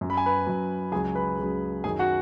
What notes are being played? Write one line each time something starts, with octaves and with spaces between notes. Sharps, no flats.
F#2 F#3
B5
G#5
B4 B5
F#2 F#3
C#2 C#3 F#3 G#4 G#5
B4 B5
C#2 C#3 F#3
F#2 D#3 F#3 G#4 G#5
F#4 F#5